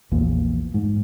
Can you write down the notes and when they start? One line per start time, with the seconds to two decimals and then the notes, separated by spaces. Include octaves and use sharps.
0.12 A#1 E2 A#2
0.74 G#2